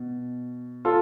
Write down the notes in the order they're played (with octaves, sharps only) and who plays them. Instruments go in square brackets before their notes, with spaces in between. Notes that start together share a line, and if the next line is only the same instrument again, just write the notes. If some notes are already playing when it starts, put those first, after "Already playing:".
Already playing: [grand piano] B2
F4 A4